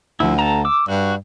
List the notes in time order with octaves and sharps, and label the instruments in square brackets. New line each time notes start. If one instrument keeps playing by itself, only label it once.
[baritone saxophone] D2 [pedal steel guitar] F3 E4
[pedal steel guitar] A4 A5 A#5
D6 E6
[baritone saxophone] G2 [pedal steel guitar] F#4